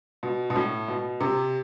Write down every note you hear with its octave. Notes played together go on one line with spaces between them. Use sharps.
B2
B2
A2
B2
C3